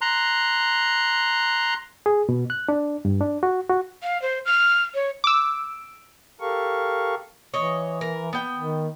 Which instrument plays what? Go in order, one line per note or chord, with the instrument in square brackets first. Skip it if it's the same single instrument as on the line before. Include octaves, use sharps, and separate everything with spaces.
[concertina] A#5 C6 F#6
[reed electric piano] G#4
B2
F#6
D4
G2
D4
F#4
F#4
[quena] F5
C5
F6
C#5
[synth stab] D6 E6
[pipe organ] G4 A4 A#4 F5 C#6
[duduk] E3 [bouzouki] C#5 D#5
[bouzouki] A#4
B3 G5
[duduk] D#3